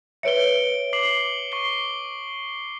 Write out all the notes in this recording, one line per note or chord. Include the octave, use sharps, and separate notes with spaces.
B4 C#5 E5 C#7 D7 G7
D6 C7 F#7
C#6 C7 G7